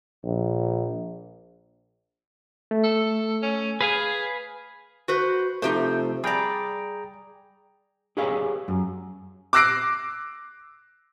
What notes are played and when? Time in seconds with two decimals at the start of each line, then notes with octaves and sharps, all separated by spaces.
0.24 A#1
2.71 A3
2.84 A4
3.42 C#4
3.81 G#4 B4 F5 G#5
5.08 F#4 B4 C5
5.62 C3 F3 A3 D#4 G4 C5
6.24 G3 G#4 D5 G5 A#5
8.17 G4 G#4 B4 C#5 D#5 F5
8.68 F#2
9.53 D6 E6 F#6 A#6 C7 D7